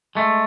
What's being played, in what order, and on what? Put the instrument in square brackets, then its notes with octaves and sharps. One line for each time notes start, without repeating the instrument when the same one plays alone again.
[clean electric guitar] G#3 A3